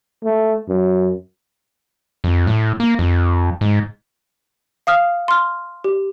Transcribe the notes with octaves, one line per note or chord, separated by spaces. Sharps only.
A3
F#2
F2
A2
A#3
F2
G#2
F5 D#6 F6
C6 F6
G4